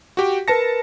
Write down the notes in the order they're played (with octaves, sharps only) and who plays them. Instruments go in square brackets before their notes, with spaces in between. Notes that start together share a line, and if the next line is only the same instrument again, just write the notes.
[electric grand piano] F#4 G4 G5
[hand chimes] A#4 B4 C#7 [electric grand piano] A5 A#6